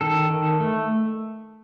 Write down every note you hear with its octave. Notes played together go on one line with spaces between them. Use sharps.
D#3 A4
D#3
A3